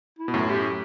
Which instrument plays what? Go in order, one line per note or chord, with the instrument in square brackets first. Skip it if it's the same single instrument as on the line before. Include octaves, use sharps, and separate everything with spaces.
[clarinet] E4
[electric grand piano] B2
F#2 A2
[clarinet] G4